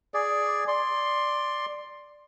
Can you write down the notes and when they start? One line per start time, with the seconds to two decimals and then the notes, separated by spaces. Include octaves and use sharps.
0.14 G#4 D5
0.68 D5 C6